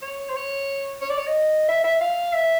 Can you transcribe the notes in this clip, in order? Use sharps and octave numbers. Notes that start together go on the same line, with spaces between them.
C#5
C5
C#5
C#5
D5
C#5
D#5
E5
E5
F5
E5